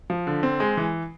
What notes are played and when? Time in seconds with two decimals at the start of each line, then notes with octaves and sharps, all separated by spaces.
0.10 F3
0.27 D3
0.43 C4
0.60 G#3
0.77 E3